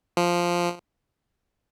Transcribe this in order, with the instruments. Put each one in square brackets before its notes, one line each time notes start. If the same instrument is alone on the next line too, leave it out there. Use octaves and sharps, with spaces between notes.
[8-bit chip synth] F3